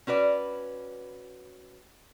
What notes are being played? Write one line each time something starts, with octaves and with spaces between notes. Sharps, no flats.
C#4 F#4 B4 D5